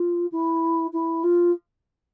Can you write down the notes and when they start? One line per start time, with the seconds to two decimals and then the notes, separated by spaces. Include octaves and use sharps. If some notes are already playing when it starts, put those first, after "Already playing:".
Already playing: F4
0.32 E4
0.93 E4
1.23 F4